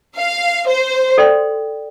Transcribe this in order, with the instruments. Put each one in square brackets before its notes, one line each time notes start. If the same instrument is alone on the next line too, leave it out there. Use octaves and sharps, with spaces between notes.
[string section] F5
C5
[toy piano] A4 D5 G5 C6